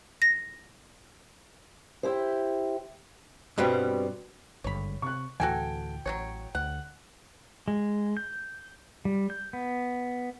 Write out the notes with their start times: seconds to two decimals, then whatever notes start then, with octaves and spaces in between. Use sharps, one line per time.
0.22 A#6
2.03 E4 G4 C5
3.58 G2 B2 G3 B3 C4
4.64 G#1 G2 D3 C#5 B5
5.02 C3 C#6 F#6
5.40 D2 A2 E3 F#4 A4 G5 G#5
6.06 A1 F#3 C4 C#5
6.55 D2 F#5
7.68 G#3
8.17 G6
9.05 G3
9.30 G6
9.53 B3